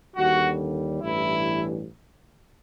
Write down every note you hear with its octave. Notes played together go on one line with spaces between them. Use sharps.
D#2 D3 G3 F#4
A1 G2 E3 E4